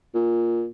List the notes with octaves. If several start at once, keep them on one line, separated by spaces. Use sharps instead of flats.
A#2